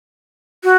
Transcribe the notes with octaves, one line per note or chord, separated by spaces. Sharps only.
F#4